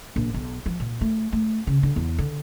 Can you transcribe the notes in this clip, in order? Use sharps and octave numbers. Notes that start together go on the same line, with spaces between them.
A#1
B1
F3
A#2
A3
A3
C#3
D3
E2
D3